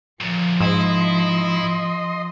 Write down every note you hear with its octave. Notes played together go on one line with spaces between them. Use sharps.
D2 A#2 F3
G#2 E4 D#5 C6